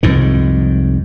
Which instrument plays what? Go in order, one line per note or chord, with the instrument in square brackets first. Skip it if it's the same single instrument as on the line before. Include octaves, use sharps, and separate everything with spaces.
[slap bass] C2 F2 G#2 D#3